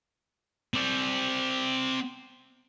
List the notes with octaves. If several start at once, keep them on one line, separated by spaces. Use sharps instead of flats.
C4 D5